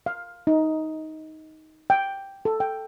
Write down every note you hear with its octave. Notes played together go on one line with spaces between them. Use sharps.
F5
D#4
G5
A4
G5